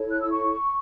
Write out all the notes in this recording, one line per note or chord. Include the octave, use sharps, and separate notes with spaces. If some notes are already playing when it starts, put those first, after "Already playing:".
Already playing: E4 A4 C#5
F#6
E6
C#6